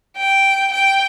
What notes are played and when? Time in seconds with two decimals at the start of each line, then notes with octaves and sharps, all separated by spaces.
0.17 G5
0.73 G5